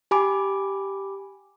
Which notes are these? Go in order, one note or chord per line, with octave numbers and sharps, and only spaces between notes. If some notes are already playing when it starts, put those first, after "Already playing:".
G4 G#5 B5 D6